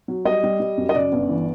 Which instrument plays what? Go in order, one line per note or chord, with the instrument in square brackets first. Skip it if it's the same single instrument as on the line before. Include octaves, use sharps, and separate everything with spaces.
[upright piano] F#3
G3 D#5
G3
G3
F#2
D#5
C#3 D5
G1
E3